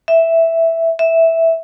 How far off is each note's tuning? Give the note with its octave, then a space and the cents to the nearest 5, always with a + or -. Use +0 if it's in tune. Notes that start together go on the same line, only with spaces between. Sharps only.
E5 +0
E5 -5